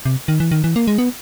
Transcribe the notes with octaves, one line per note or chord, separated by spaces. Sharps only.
C3
D#3
E3
D#3
E3
A#3
G#3
B3